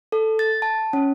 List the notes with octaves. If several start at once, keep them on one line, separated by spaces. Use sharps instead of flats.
A4
A6
A5
C#4